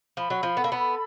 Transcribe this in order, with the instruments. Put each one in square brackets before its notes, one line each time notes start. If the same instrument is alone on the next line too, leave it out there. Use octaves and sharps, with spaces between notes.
[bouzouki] F3 [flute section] B5
[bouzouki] F#3
F3
[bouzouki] B3 [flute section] A4
[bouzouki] A#3
B3